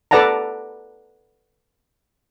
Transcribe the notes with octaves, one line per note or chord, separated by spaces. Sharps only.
A4 B4 D5 F#5 A5 A#5